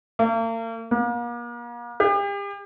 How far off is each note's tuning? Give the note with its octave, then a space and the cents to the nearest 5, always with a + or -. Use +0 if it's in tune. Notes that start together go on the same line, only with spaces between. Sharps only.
A#3 -40
A#3 +40
G4 +40